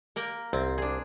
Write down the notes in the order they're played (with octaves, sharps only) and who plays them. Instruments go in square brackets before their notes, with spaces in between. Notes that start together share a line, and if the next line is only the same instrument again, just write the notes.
[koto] A#3 A#4 G5
[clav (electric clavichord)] C2 [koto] C4
[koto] D4 G#4